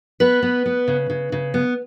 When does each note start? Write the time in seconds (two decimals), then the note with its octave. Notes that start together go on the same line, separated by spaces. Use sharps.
0.20 B3 B4
0.42 B3
0.66 B3
0.88 C#3
1.10 C#3
1.32 C#3
1.54 B3